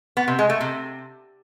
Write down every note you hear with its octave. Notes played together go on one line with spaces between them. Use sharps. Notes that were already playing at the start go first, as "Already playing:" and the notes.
B3
C3
G#3
A3
C3